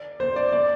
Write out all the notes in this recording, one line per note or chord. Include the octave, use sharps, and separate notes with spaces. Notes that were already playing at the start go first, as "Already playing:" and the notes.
Already playing: D5
C5
D5
D5